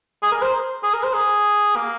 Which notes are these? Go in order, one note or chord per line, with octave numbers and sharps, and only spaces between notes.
G#4
A#4
C5
G#4
A#4
C5
G#4
A#3